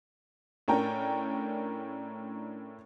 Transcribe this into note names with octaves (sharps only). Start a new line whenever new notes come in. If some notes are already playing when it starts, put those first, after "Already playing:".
A2 C#4 D4 A#4 G5 A#5